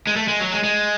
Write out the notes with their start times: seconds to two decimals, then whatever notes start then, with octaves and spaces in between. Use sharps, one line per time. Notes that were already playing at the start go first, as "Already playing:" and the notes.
0.07 G#3
0.16 A3
0.28 G#3
0.40 F#3
0.52 G#3
0.64 G#3